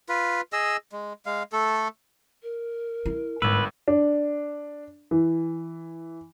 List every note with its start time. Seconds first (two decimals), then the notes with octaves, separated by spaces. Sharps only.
0.09 F4 B4
0.53 G#4 D#5 E6
0.92 G#3
1.26 G#3 F5
1.53 A3 A4
2.42 A#4
3.06 E4
3.42 G1 G#2 B4 E6
3.88 D4
5.11 E3